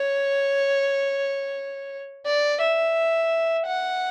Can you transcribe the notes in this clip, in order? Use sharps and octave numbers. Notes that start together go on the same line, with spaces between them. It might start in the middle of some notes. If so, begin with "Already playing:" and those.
Already playing: C#5
D5
E5
F#5